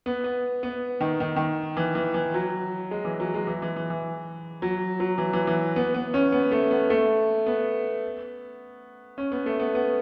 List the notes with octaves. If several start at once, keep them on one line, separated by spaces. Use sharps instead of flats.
B3
B3
B3
D#3
D#3
D#3
E3
E3
E3
F#3
G#3
E3
F#3
G#3
E3
E3
E3
E3
F#3
F#3
E3
E3
E3
B3
B3
C#4
B3
A3
B3
A3
B3
C#4
B3
A3
B3
B3